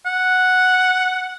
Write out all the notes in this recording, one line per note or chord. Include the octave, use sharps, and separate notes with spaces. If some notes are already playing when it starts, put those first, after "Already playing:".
F#5